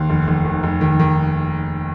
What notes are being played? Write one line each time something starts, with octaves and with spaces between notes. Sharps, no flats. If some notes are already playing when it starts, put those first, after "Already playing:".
Already playing: D#2 C6
F1
F1
D#3
F1
D#3
D#3